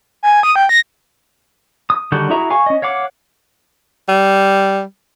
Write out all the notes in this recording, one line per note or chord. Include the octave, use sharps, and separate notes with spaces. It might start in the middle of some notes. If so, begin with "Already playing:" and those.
G#5
D#6
G5
A#6
D#6
D3 D#3 G3 F#4 G6
E4 F#4 G#4 E5 A#5
F5 G#5 C#6
C#4 D#5
C#5 F5 F#5 D6
G3